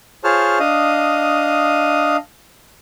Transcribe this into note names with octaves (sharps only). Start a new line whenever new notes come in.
F4 G#4 C5 C#5 A5 F6
D4 D#5 F5 D#6